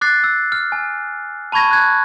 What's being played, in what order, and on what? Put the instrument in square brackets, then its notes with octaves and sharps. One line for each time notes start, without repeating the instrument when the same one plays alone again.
[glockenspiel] D6 F#6 A6 C7
E6
F6
G#5
A5 B5 C#6 G#6 A#6
F#6 G#6